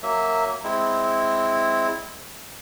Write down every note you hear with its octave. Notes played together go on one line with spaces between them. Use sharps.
F#3 A#3 E5
G#3 C4 E4